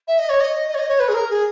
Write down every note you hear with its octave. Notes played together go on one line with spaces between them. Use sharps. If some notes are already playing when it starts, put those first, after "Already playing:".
E5
D#5
C#5
D#5
D#5
C#5
D#5
C#5
B4
G#4
A#4
G#4